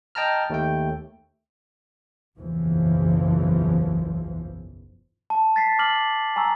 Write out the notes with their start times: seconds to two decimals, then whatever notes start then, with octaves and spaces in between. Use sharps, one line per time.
0.15 D#5 G5 A5 A#5 F6
0.50 D#2 A3 G5
2.39 F#1 B1 E2 E3 F3
5.30 A5
5.56 A6 B6 C7
5.79 D6 F6 F#7
6.36 G#5 A#5 C#6 E6